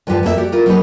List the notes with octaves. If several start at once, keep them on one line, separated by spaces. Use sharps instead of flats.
D2 G2 F3 G4 B4 A5
F2 A#3 A4 E5
F#4 G4 D5
E4 F4 A#4
F#3 A#3 B3 D#4 G4 B4